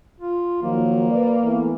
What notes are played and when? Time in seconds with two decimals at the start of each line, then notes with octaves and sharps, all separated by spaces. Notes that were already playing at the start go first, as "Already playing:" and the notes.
0.20 F4
0.63 D#3 F3 F#3 A#3
1.11 B4 D5
1.43 E3 A3 B3